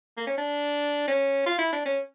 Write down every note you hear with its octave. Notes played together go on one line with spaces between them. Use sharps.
A#3
C#4
D4
C#4
F4
E4
D4
C#4